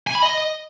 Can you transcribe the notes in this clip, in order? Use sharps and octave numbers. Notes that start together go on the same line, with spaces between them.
G#5
B5
D#5